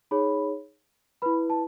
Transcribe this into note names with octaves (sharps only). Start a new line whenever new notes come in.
D#4 G#4 C#5 B5
E4 B4 B5
A5